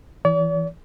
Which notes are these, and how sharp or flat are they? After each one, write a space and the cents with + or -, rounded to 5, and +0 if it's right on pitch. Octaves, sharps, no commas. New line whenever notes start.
E3 +0 D5 -45